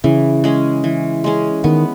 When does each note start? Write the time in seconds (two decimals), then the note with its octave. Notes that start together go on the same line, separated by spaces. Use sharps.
0.04 C#3 E3
0.44 G#3 C#4 G#4
0.84 E3
1.24 G#3 C#4 G#4
1.64 D#3 B3